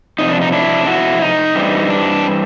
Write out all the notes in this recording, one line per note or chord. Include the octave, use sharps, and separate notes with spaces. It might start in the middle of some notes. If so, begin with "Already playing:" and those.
F2 C3 D#4
D4
D#4
D4 E4
E4 F#4
D#4
G2 E3 G3 C4
D4